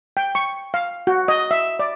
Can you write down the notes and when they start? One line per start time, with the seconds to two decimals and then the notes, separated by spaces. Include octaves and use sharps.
0.17 G5
0.35 C#6
0.74 F5
1.07 F#4
1.28 D#5
1.51 E5
1.79 D5